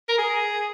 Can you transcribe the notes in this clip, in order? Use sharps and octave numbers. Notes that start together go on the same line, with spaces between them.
A#4
G#4